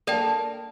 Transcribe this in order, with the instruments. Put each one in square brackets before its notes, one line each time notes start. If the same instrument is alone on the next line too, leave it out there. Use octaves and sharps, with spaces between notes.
[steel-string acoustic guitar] A#3 D4 [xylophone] A4 D5 G5